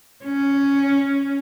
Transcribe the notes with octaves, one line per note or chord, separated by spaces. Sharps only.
C#4